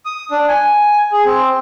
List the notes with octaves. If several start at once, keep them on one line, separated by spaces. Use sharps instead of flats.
D#6
D4
G#5
G#4
C4